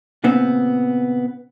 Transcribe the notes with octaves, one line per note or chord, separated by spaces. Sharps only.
A#2 C#3 B3 C4